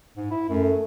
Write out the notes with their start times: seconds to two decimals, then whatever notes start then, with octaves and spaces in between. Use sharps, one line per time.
0.17 G#2
0.31 E4
0.49 F#2 A3